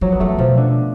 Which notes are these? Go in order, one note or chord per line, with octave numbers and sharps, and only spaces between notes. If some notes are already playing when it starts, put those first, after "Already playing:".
F3 F#3
B3
F3 A3
B2 F3
D3